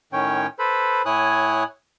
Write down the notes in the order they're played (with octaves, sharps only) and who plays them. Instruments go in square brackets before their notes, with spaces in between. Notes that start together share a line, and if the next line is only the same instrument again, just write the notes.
[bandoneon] A2 D#3 C#4 C#5 G5
A4 B4 C5 B5
A2 E4 C#5 G#5 D#6 F#6